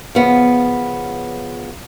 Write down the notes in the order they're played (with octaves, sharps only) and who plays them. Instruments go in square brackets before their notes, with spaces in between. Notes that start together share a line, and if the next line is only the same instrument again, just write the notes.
[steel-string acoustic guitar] C#3 F3 B3